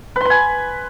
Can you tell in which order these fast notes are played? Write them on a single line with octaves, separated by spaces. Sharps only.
B4 C6 B5 G#5